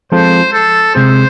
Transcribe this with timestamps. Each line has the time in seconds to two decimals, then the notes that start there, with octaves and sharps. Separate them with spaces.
0.12 F3 G#3 C4 F4 A4 C5
0.53 A4
0.95 C3 G#3 C4 G#4 C5